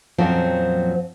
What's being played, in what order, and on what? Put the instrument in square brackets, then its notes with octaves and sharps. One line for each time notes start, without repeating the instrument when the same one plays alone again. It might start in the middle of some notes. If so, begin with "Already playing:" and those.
[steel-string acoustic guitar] F2 A#2 F#3 C4 C#4 F#4